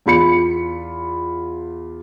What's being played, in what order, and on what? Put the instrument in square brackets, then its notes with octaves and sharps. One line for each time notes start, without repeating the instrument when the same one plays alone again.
[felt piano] E2 F4 B5 C#7